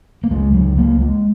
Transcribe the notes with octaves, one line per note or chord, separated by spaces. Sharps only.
A#3
C#2 C#3 G#3
F#3
A#3
G#3